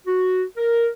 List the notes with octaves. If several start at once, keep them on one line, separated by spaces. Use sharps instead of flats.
F#4
A#4